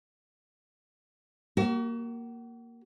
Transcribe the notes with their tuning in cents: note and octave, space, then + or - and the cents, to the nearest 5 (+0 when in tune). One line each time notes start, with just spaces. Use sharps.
A#3 +0 F#4 +40